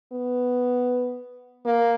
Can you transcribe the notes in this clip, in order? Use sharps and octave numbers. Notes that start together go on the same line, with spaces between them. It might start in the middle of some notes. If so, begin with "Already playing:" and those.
B3
A#3